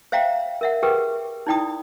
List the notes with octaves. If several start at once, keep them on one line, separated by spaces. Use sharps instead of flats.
C5 E5 F5 G5 A#5
A#4 E5 F#5
G4 G#4 A#4 B4 G5
D#4 E4 D5 G5 B5 D#6